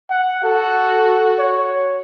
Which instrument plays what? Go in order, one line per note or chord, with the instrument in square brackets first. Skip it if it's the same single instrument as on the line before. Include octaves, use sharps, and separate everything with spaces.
[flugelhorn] F#5
[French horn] F#4 [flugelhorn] A4
[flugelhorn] C#5